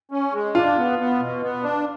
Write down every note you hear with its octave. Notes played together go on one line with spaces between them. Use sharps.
C#4
G#3
D4 F4
B3
B3
B2
B3
D4